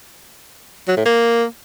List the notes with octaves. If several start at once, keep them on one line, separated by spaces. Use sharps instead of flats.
F#3
A2
A#3